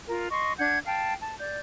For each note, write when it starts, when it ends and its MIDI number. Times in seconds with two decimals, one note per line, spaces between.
0.08 0.28 65
0.08 0.28 70
0.30 0.53 75
0.30 0.53 84
0.30 0.53 85
0.58 0.78 62
0.58 0.78 78
0.58 0.78 91
0.58 0.78 92
0.86 1.14 77
0.86 1.14 79
0.86 1.14 81
1.21 1.36 81
1.38 1.60 74
1.38 1.60 91